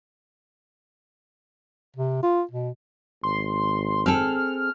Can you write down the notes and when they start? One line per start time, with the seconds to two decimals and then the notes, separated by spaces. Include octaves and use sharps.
1.96 C3
2.23 F4
2.51 B2
3.23 G#1 C6
4.06 C4 G#4 A4 F6